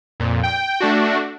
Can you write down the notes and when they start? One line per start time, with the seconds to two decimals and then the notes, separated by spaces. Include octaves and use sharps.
0.20 F2 A#2
0.43 G5
0.80 A3 D4 F#4